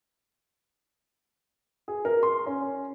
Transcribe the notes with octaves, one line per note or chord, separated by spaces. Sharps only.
G#4
A#4
C6
C#4